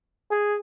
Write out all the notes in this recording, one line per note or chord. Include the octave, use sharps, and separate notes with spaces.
G#4